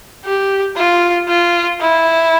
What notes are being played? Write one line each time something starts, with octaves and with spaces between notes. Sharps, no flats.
G4
F4
F4
E4